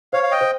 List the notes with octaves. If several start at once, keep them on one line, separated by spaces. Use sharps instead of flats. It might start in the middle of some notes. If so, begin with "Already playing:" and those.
C5 C#5 F5
F5
D#5 G5
C5